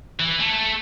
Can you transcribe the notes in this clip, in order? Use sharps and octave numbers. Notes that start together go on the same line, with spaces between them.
E3
A3